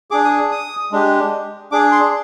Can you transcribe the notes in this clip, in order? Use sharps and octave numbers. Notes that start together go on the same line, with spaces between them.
D4 G#4 D6
D#6
D#6
G#3 D4 G4
D4 G#4 D6
C6